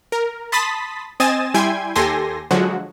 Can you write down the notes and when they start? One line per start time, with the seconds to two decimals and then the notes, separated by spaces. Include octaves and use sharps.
0.12 A#4
0.52 A5 B5 C6 D#6 A6 B6
1.20 C4 D#5 G#5 D#6 A6 E7
1.54 G3 E4 G5 G#5 C6 G#6
1.96 D#2 G4 A4 G#5 C6 A#6
2.51 D3 F3 F#3 G#3 F#4